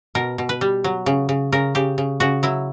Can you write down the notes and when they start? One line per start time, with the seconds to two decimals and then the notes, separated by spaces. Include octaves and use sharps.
0.15 B2 A#4
0.38 B2
0.49 B4
0.61 G3
0.84 F#3
1.06 C#3
1.29 C#3
1.53 C#3 A#4
1.75 C#3 G4
1.98 C#3
2.20 C#3 F#4
2.43 F#3 E4